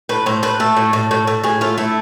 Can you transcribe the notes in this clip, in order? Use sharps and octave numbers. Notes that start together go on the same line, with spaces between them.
A2 B4
A2 C5
A2 B4
A3 A4
A2
A2
A2
A2
A2 G#4
A3 F4
A3 E4